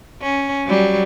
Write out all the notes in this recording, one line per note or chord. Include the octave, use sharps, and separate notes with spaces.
C#4
F#3 G3